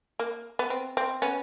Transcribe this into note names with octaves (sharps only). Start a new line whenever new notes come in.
A#3
B3
C4
C4
B3 C#4